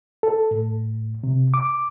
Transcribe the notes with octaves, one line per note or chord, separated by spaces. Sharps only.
A4
A2
C3
D6